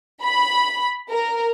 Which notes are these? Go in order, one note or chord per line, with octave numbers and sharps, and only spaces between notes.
B5
A#4